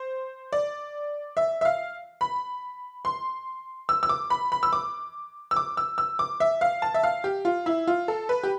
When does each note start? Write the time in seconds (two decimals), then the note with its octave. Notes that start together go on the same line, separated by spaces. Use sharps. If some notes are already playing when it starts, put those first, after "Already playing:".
Already playing: C5
0.52 D5
1.37 E5
1.61 E5
1.65 F5
2.21 B5
3.05 C6
3.89 E6
4.03 E6
4.09 D6
4.30 B5
4.52 B5
4.63 E6
4.73 D6
5.51 E6
5.56 D6
5.77 E6
5.98 E6
6.19 D6
6.40 E5
6.61 F5
6.82 A5
6.94 E5
7.03 F5
7.24 G4
7.45 F4
7.66 E4
7.87 F4
8.08 A4
8.29 B4
8.43 G4